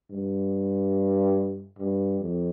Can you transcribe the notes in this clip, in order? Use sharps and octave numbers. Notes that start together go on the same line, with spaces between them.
G2
G2
F2